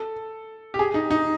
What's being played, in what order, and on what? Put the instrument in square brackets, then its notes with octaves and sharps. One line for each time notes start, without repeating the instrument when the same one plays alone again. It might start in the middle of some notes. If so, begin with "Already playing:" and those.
Already playing: [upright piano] A4
G4
G#4
D#4
D#4